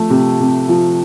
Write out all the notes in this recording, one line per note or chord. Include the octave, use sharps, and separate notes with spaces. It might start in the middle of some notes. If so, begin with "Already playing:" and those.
Already playing: F3 A3
C3
C3
F3